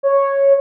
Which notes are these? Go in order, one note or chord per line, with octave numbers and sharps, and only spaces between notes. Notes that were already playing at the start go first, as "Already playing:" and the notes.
C#5